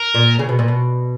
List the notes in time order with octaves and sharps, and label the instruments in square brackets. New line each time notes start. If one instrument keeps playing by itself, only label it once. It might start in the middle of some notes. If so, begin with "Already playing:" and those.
Already playing: [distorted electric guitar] A#4
[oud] A#2
C#3
B2
A#2
B2